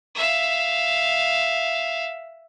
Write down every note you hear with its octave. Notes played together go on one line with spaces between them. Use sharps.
E5 F5